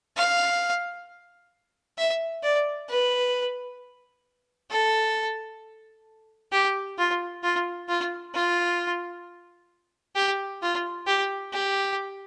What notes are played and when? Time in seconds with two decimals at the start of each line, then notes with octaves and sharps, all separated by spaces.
0.17 F5
1.98 E5
2.43 D5
2.89 B4
4.70 A4
6.52 G4
6.98 F4
7.43 F4
7.88 F4
8.35 F4
10.16 G4
10.62 F4
11.07 G4
11.53 G4